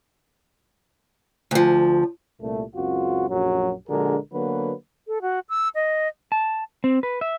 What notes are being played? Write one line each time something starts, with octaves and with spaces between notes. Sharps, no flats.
D2 F3
C2 A#2 A3
C#2 F#2 C4 F4 F#4
A#1 F#2 F#3
A#1 D3 G#3 F#4 G#4 A#4
D3 F#3 A#3 B3 F#4 B4
A4
F#4
E6
D#5
A5
C4
B4
E5